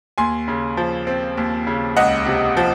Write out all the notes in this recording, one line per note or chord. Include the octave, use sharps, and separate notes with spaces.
D#2 G#5 C6
C#3
F3
C4
D#2
C#3
C#2 D#5 F#5
C3
F3